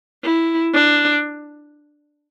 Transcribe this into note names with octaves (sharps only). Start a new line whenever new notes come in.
E4
D4